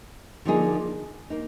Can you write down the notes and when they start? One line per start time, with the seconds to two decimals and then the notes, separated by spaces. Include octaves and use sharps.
0.45 D3 F3 A#3 D#4 G#4
1.30 A#3 D#4